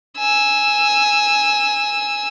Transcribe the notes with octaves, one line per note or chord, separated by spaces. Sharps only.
G#5 E6